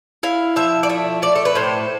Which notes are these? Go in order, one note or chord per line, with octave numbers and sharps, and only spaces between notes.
E4 F5
F3 E5
D5
A3 E5
A3 D5
A4
B4
A2 C5